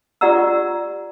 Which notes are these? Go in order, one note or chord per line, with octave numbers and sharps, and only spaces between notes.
F4 G4 D5 F#5 A#5 E6